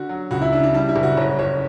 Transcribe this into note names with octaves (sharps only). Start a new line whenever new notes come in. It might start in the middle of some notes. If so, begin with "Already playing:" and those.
Already playing: D3 F#4
F#3
C#2 F#4
E4
C#3 D4
D4
G3 D4
E4
F#1
F#4
G1 C#5
G1 C#5